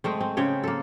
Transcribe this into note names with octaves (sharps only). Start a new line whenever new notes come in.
G#3 A3 C4
C4
C#3 C4 C#5 G5
A#3 A4